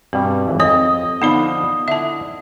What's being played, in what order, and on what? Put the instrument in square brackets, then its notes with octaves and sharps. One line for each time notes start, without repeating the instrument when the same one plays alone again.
[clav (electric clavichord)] G2 B2 G3 [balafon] C4
[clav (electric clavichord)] G#1 E3
[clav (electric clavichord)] F2 [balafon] C4 C#5 [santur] D#5
[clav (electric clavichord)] D3 F3 [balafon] B3 D#4 B5
[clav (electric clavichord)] D3 E4 [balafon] E5 A5